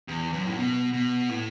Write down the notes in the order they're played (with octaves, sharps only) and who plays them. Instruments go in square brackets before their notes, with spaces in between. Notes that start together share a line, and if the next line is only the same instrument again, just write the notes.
[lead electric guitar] E2
F#2
A2
B2
B2
A2